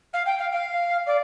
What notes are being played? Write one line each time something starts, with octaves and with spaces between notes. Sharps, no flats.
F5
G5
F5
F5
D5